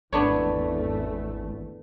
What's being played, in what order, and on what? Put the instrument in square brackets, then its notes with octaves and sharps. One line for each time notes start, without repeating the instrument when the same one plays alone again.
[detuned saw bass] G#1 [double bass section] E2 A3 [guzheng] B3 D4 C#5